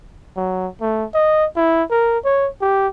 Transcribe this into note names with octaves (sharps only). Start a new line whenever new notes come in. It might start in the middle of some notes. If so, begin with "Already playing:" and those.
F#3
A3
D#5
E4
A#4
C#5
G4